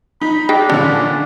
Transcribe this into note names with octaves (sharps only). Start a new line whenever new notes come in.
D#4 B5
D4 G#4 D#5 G5
A#2 D3 C#4 A4